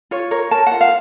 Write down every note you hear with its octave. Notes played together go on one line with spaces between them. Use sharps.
F4 C#5
A#4 C#5
A#4 A5
F4 F#5
F5